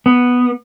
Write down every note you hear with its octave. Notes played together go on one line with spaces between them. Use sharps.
B3